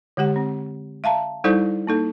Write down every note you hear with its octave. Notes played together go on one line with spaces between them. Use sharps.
D3 G#3 G4 F#5
C4
E5 F5 A5 A#5
G3 D#4 E4 A4 C5 D5
A#3 D#4 A4